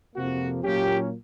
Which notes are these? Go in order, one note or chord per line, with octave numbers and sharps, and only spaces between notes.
F2 C3 F3 A#3 F#4
A#2 F#3 A#3 C#4 F4 G4